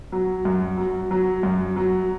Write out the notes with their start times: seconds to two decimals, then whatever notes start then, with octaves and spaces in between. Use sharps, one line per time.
0.12 F#3
0.45 F#2
0.77 F#3
1.11 F#3
1.43 F#2
1.76 F#3